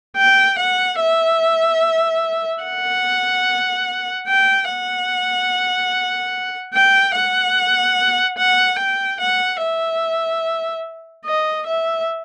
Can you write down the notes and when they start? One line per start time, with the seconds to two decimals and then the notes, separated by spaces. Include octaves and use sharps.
0.17 G5
0.58 F#5
0.99 E5
2.63 F#5
4.28 G5
4.69 F#5
6.74 G5
7.15 F#5
8.38 F#5
8.79 G5
9.20 F#5
9.61 E5
11.26 D#5
11.67 E5